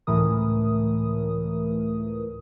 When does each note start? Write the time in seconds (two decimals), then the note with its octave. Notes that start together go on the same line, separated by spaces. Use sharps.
0.07 C#2 A2 E3 A3 A#4 D#6